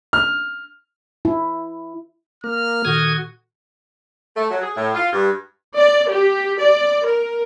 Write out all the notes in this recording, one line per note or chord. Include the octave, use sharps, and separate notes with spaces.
F6
E4
A#3 F6
A#2 D#3 F#4 A4 D#6 G#6
A3
F#3
G#4
A2
F4
G2
D5
G4
D5
A#4